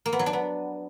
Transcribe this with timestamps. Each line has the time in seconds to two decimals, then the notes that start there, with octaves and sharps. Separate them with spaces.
0.06 A#3
0.12 B3
0.19 F#3
0.26 D4
0.33 B3